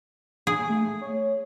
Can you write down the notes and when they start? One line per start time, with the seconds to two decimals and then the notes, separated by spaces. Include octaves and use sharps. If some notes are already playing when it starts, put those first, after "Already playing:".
0.47 G#4
0.69 A3
1.01 C#5